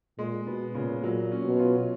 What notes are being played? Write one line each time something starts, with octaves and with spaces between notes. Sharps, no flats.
A#2 G#3
B2 B3
A#2 C#3
A#2 F#3
C#4
B2
F4